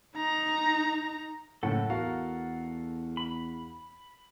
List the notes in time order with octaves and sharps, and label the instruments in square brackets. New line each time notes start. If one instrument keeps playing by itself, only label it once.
[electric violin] D#4 A#5
[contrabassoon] F#1 [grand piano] A2 [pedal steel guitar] A4 F#5
[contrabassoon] E2 [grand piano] F#4 A#4 F5
[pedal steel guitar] B5